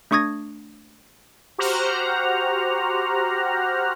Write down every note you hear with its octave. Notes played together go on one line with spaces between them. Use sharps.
A3 D4 C#6 D#6 G#6 A#6
F#4 G4 C5 F#5 A#5 F6